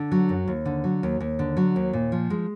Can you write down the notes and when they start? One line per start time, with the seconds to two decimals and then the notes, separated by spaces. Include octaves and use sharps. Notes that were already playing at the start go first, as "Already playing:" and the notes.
Already playing: D3
0.12 F#3
0.29 F#2
0.48 D#2
0.66 D3
0.84 F#3
1.03 D#2
1.20 D#2
1.39 D3
1.57 F#3
1.76 D#2
1.93 A#2
2.12 F3
2.30 G#3